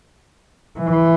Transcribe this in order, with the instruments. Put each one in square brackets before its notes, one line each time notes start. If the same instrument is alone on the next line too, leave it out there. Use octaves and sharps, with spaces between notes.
[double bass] E3